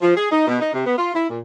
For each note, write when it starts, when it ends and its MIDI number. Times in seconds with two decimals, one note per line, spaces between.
0.02 0.14 53
0.17 0.30 68
0.32 0.45 63
0.47 0.59 47
0.60 0.73 63
0.73 0.82 48
0.85 0.96 59
0.98 1.12 65
1.14 1.28 64
1.29 1.40 46